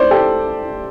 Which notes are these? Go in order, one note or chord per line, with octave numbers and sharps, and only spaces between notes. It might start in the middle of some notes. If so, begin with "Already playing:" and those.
Already playing: C5 D5
G4 A4